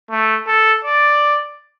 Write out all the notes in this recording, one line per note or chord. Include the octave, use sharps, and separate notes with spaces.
A3
A4
D5